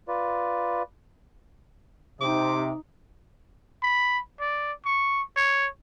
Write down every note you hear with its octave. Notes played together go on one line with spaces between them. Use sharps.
F4 B4 D5
C3 D#4 D6
B5
D5
C#6
C#5